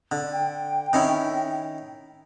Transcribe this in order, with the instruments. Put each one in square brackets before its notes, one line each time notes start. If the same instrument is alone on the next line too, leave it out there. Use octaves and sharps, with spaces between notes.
[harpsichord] D3
[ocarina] G5
[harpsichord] D#3 C#4 E4